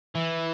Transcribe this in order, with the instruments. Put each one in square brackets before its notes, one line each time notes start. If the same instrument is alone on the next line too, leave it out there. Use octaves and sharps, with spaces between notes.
[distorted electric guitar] E3